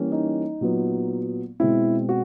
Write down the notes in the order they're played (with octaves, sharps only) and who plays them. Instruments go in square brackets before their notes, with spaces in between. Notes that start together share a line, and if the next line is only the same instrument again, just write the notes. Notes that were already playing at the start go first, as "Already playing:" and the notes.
Already playing: [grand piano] E3 G3 A#3 C#4
D#4
A#2 F#3 B3
B2 G#3 C4 E4
F#4